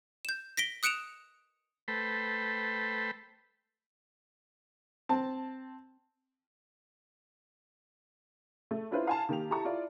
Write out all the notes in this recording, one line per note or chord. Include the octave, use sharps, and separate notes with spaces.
G6 E7
A#6 B6 D7 G7
D#6 F#6 C#7 D7 E7 F7
A3 A4 B4 C5 G5 B5
C4 A5
A3
C#4 D4 E4 F4 B4 C5
F5 G#5 A5
D#3 A#3 G4 F7
E4 G4 A5 A#5 C#6
E4 F4 D5